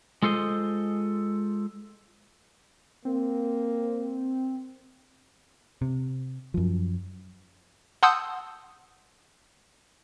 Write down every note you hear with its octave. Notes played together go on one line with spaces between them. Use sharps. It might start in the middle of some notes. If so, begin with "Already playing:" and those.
G#3 F4 A4 C5 D#5
A#3 C4
C3
F#2 F3
F#5 A5 C6 D#6 E6 G6